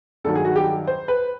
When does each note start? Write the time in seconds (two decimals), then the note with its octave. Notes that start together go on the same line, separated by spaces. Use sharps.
0.24 G2 D#3 F#3 A4
0.35 G#4
0.45 F#4
0.56 G4
0.87 C5
1.08 B4